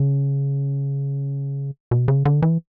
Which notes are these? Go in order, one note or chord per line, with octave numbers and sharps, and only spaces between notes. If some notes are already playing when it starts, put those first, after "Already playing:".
Already playing: C#3
B2
C#3
D3
E3